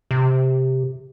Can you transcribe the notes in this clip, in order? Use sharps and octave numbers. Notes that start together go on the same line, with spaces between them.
C3